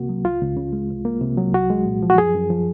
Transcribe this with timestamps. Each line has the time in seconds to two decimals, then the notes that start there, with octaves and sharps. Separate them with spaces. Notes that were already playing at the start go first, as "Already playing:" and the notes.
Already playing: C2 C3 A#3 F#4
0.09 F#3
0.24 C#2 F4
0.41 C#2
0.57 C#3
0.73 G#3
0.89 C2
1.05 A#3
1.21 C3
1.37 F#3
1.53 C2 F#4
1.70 G#3
1.86 A#2
2.03 F3
2.10 F#4
2.18 F#2 G#4
2.35 F#2
2.50 F3